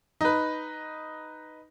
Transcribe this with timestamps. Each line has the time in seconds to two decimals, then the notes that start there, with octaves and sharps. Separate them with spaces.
0.21 D#4 B4